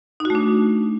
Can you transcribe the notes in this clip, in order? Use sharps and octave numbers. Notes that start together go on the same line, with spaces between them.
A3 D4 D#4 F#4